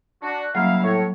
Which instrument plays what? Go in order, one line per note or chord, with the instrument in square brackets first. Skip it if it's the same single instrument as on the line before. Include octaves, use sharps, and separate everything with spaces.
[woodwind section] D4 F#4
[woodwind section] C#3 E4 F5 [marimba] F#3 G3 A#3
[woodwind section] A2 C#5